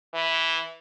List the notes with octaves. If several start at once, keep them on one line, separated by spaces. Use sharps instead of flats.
E3